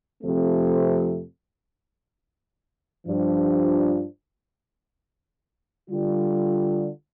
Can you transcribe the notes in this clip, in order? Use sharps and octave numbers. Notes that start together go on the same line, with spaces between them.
F2 C3 F3 A3 C4
G2 F3 D4
D3 G3 F4